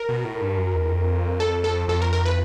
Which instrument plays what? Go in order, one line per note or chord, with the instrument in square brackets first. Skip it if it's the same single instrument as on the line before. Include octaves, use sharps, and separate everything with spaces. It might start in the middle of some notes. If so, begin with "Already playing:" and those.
Already playing: [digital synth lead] A#4
[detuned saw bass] B2
A2
G2
F#2
E2
F2
[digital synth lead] A4
A4
[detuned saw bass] F2 [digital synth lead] A4
[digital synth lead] A#4
A#4
B4